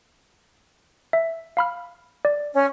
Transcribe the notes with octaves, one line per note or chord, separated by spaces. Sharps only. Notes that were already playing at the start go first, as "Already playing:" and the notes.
E5
F5 B5 F6
D5
C#4